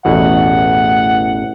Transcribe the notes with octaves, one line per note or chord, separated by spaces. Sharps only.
A1 E2 B2 F#5